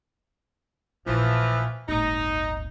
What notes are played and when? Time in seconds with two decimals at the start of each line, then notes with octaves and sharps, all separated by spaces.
1.06 A#1 E3 F3
1.89 D1 G1 D#4